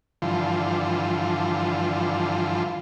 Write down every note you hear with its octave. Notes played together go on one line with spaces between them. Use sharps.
G2 D3 E3 F3 F4